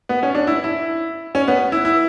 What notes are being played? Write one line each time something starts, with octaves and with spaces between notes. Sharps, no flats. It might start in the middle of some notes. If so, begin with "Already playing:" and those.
B3
C#4
D4
E4
E4
C#4
B3
E4
E4